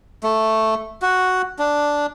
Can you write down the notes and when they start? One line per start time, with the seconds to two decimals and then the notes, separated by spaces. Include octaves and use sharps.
0.23 A3
1.02 F#4
1.59 D4